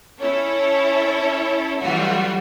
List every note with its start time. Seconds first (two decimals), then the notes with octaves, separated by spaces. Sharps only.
0.20 C#4 E4 A4 C#5
1.80 E3 F#3 G3 A3 F4 F#4